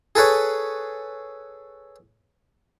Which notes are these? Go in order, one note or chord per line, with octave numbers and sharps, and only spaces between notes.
G#4 A4 B4 C#5